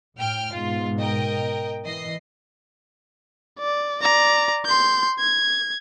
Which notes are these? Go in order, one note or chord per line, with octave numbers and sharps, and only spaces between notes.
A2 G5 F6
G#2 B2 F4
A#4 D#5 G5
E3 D#5 C7
D5
D5 A#5
C6 G6
G#6